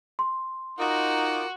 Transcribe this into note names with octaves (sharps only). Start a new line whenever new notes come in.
C6
D#4 F4 F#4 A#4 D6